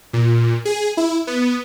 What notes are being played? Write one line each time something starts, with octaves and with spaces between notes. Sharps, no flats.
A#2
G#4
E4
B3